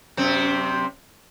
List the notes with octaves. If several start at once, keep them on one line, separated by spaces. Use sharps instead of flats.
F#2 C3 C4